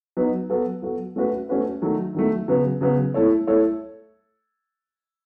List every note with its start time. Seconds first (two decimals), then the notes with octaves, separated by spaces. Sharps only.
0.17 F#3 B3 D#4
0.50 F#3 B3 F#4 A4
0.82 F#3 B3 F#4 A4
1.16 A3 C#4 F#4 B4
1.49 A3 C#4 F#4 B4
1.82 D#3 F#3 A3
2.15 D#3 F#3 A3
2.48 C#3 F#3 B3
2.81 C#3 F#3 B3
3.14 A3 E4 A4 C#5
3.47 A3 E4 A4 C#5